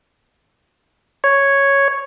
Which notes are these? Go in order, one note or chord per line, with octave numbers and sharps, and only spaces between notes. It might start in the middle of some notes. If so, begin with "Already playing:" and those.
C#5